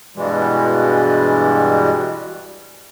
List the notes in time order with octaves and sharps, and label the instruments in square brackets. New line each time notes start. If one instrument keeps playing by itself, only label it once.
[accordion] G2 B2 E3 G3 G#3